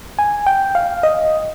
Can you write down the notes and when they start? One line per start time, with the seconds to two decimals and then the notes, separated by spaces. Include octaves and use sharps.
0.19 G#5
0.47 G5
0.75 F5
1.03 D#5